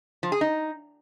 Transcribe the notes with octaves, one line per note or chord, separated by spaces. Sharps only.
F3
G#4
D#4